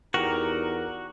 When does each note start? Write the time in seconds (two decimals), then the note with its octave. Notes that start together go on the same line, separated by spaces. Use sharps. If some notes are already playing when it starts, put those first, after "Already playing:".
0.14 E2 D#4 F#4 G4 A#4 G5 A#5